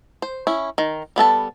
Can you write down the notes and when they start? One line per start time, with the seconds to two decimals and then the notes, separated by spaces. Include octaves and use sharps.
0.22 C5
0.47 C#4 E4
0.78 D#3
1.16 G3 B3 A4 A5